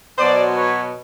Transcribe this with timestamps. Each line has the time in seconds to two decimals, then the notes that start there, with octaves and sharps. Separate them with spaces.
0.18 B2 F#3 C5 D5
0.55 B4 C#5